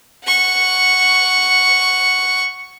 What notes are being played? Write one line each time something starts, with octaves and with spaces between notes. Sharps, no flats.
F#5 C#6